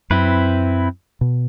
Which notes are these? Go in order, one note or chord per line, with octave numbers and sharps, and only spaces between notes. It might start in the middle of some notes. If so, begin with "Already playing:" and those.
F#2 C4 E4 B4
B2